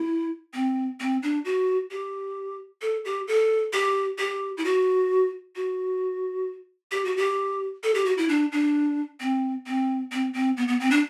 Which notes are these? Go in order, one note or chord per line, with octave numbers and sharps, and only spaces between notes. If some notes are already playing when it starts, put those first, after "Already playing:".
Already playing: E4
C4
C4
D4
F#4
G4
A4
G4
A4
G4
G4
E4
F#4
F#4
G4
F#4
G4
A4
G4
F#4
E4
D4
D4
C4
C4
C4
C4
B3
B3
C4
D4